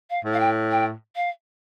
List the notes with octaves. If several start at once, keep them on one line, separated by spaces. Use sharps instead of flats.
F5
A2
F5
G5
G5
F5